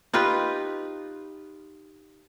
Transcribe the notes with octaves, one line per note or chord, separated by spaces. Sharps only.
D#4 F4 G4 B4